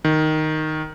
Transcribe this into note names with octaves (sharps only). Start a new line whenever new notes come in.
D#3